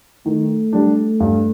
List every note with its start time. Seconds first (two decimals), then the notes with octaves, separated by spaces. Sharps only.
0.26 D#3 A3
0.73 G3 D4
1.20 G2